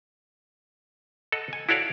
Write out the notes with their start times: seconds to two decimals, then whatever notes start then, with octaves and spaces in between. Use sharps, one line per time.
1.32 A4 D#5 F#5
1.53 G#5
1.69 E4 F#4 A4 C#5 D5 F5